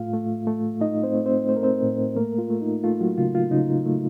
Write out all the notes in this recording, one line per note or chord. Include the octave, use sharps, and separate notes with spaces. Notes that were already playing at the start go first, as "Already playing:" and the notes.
Already playing: A2 A3 F4 F5
A3
A3
A3 D#4 D#5
C4 C5
A3
C4 C5
A3 C5
A#4
C4 C5
A2
A3 A#3 A#4
F4
A3
D#4
A3 F4
F#3 F#4
C#3 F4
F4
C#3 D#4
A3